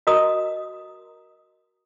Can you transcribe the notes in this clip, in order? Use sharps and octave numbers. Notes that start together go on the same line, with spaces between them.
F#4 A#4 D#5 A#5 D#6